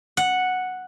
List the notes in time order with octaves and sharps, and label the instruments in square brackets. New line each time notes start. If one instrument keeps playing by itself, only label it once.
[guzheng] F#5